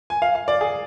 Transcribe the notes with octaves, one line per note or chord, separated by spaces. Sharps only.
G#5
F5
F5
D5
G#4